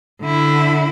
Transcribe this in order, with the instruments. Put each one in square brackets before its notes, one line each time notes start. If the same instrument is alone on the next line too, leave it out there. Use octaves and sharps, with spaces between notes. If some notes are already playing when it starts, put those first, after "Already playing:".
[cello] D3 E4